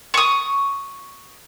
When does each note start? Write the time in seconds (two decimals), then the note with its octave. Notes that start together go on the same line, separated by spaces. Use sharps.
0.14 C#6 D#6